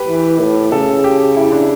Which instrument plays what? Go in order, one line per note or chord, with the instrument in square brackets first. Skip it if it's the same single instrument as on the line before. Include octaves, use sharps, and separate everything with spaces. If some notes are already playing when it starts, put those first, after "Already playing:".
Already playing: [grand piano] G4 B4
[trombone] E3
A2
[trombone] C#3 [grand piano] A4
[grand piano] G4
E4
D4